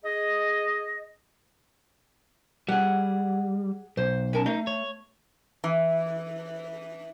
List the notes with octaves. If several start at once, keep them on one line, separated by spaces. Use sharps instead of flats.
G#4 D#5
G3 G#4 F#5
B1 C5
C#4 A#4 A5
A3 D#4
C#5
E3